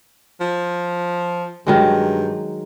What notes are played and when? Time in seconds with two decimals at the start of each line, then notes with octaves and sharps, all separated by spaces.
0.41 F3
1.67 G2 D#3 F#3 G#3